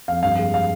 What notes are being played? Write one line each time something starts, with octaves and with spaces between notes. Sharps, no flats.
F2 F5
G2 F5
G#3
F5